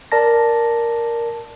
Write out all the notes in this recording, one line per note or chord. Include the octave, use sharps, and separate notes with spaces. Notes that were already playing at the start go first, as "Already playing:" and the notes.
A#4 D5 A5 A#6